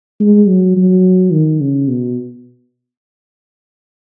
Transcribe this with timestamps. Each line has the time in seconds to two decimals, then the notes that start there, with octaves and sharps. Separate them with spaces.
0.20 G#3
0.48 F#3
0.77 F#3
1.32 D#3
1.61 C#3
1.88 B2